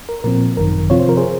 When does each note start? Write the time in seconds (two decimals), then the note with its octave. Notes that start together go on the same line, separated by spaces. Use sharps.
0.09 A#4
0.24 A#2 F3 C4 A#4
0.57 G#1 F#2 D#3 A#4
0.90 C3 F3 C4 F4 C#5
0.99 C5
1.09 A#4
1.17 G#4 C5